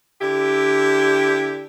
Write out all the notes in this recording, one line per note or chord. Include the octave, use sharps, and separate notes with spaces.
D3 E4 G4